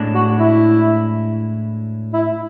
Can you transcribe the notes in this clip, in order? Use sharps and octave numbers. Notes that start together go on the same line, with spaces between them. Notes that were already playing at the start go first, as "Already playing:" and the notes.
Already playing: A2 G#3 D4
F#4
E4
E4